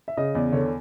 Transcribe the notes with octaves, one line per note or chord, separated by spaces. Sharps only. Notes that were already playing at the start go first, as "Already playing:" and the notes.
E5
C#3 D#5
E2 D5
D3 C#5